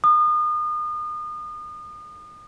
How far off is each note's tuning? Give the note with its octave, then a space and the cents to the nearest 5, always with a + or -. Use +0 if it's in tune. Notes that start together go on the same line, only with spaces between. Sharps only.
D#6 -35